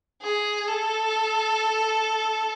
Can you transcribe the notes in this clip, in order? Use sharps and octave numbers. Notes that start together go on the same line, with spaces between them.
G#4
A4